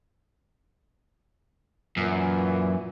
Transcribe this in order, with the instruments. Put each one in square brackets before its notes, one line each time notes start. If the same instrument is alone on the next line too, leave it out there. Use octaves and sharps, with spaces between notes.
[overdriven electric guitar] F#2 [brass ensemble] A#2 E3